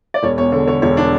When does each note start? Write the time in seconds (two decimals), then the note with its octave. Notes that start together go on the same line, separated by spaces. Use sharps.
0.14 D5
0.23 E1 C#5
0.38 E2 C#5
0.52 D3
0.67 D3 C#5
0.82 E1 C#5
0.97 D4